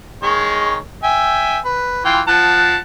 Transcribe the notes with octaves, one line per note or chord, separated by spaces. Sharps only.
D#3 G#3 C#5
E5 G5 G#5
B4
E3 F4 G5
F3 F#5 A5